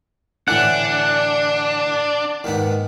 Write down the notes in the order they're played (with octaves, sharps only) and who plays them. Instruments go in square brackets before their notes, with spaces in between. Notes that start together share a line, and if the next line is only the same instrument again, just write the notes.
[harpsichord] A2 D3 E3 [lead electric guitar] D4 [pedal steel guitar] F#5
[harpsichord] D#2 G#2 B3